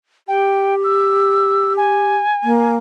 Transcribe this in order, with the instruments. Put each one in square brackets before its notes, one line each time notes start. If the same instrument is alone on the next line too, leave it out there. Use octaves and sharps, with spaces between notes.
[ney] G4 [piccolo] G5
[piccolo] E6
G#5
[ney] A#3